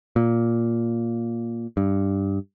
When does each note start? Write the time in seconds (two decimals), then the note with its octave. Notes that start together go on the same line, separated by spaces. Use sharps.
0.16 A#2
1.77 G2